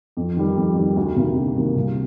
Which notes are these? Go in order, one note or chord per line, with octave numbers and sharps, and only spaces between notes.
F2
D#3 G3
F2
D#3 G3
D2
C3 D#3 A#3
D2
C3 D#3 A#3
C2